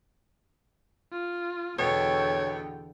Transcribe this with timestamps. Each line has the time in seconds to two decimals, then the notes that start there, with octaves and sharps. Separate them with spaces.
1.12 F4
1.79 E2 B2 D3 B3 A4 C#5 G5